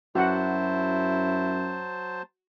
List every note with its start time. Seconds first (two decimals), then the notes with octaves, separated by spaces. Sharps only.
0.15 F#2 F#3 E4 F#4 C5 F#5 A5